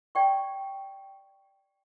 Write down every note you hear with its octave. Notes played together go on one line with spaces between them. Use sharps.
D5 G5 C#6